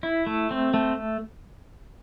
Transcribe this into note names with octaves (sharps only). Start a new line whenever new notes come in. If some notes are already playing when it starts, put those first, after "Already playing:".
E4
A3
C4
A3